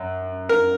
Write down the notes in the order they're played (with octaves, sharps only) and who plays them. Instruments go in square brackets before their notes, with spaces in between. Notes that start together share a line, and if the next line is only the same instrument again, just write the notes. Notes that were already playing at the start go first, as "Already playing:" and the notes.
Already playing: [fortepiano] F#2
A#4